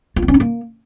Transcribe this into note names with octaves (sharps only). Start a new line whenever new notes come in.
F4
B3
C#4
D#4
A#3